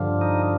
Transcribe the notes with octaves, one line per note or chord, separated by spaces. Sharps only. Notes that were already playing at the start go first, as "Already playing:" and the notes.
Already playing: G2 D3 F3
D#4